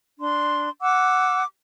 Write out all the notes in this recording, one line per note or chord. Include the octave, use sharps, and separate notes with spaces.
D4 C6
F#5 D6 E6